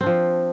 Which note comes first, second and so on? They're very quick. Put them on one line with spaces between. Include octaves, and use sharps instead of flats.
C4 D4 F3